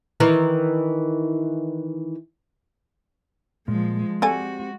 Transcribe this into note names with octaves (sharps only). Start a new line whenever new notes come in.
D#3 E3 A#4
A#2 F3 G#3
G#3 C4 F#4 G4 A4 D5 G#5